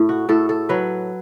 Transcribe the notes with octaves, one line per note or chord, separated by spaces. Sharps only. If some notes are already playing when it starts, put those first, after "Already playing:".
Already playing: A2
F#4
A2 A4
A4
F#3 B4